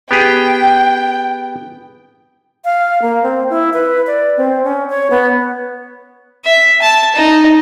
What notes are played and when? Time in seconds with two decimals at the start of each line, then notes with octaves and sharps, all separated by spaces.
0.11 B3 G4 G#4 G5
2.65 F5
3.02 A#3
3.23 C4
3.50 E4
3.74 B4
4.07 D5
4.37 C4
4.64 C#4
4.90 C#5
5.11 B3
6.45 E5
6.82 A5
7.15 D#4